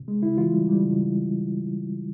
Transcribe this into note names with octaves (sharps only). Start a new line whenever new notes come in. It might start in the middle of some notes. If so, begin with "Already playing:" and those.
Already playing: C3
G#3
C#3 E4
E3 F4
G3
G3
C#3